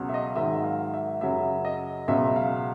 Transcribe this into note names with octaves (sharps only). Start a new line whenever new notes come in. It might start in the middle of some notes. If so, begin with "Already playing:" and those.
Already playing: C#2 B2 F#3
E5
D#5
G#2 D#3 F#3 E5
E5
F5
E5
F#2 C#3 F#3 E5
D#5
C#2 B2 F#3 E5
F5